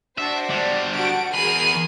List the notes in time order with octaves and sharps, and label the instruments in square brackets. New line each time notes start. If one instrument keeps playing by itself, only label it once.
[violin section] D4 F#4 C5 [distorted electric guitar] E5
[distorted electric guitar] D3 G3
[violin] F#4 [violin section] F#5 A5 D7
[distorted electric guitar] E2 B5 [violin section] G#4 A#4 F6 [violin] C7 D#7